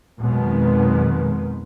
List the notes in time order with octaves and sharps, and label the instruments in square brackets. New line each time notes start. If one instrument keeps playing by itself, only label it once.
[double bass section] B1 F2 B2 D#3 G#3 B3